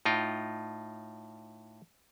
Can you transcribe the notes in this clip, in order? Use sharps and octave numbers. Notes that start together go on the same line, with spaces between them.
A2 D#4 F4 G5